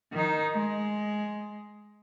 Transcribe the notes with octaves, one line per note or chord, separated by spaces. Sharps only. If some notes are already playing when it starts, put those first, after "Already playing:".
D#3 D#4
G#3